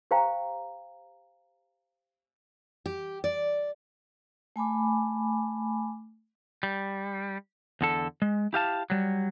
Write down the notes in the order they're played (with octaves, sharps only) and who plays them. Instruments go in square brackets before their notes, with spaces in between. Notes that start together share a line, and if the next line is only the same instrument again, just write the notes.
[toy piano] G4 C5 F5 G5 A#5
[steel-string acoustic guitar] G4
D5
[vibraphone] A3 G#5 B5 D6
[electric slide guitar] G3
E2 D3 A4
G#3
E4 G4 F5 A5
F#3 G3